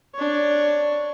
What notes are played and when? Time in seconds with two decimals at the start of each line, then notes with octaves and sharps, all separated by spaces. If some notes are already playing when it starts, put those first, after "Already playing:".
0.15 D4 C#5